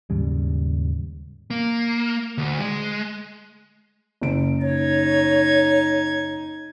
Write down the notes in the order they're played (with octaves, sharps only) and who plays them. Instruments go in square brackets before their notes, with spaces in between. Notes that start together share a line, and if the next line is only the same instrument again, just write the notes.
[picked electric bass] D#2 G#2 C#3 G3
[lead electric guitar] A#3
D2
G#3
[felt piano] F#1 D7
[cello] D#4 [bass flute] C#5 [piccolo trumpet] G#6